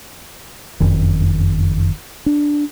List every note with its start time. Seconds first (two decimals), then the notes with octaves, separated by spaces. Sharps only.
0.80 F#1 F2 D#3
2.26 D4